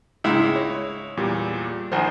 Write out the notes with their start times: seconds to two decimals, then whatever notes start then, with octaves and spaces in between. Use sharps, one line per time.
0.24 C#2 G#2 G#3 E4
0.56 C#5
1.17 E2 A#2 G3
1.92 A#1 D#3 C5 G#5